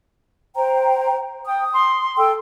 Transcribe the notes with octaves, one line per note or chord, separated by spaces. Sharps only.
C5 G5 A#5
G5 D#6
C6
A4 G5 E6